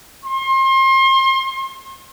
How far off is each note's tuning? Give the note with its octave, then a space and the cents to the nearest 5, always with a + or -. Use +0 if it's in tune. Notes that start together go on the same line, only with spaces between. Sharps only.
C6 +35